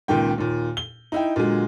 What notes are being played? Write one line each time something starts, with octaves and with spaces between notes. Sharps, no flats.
C#2 A#2 D#3 G5
D#2 A#2
G7
D#4 E4 G5
A#2 D3 F#3 G#3